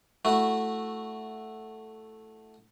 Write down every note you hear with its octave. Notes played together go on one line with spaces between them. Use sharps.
A3 E4 F#4